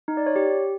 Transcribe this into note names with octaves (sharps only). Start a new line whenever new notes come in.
D#4
D5
C#5
G4